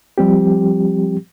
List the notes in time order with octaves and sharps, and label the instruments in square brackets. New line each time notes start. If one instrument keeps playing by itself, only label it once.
[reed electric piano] F3 G3 C4 G4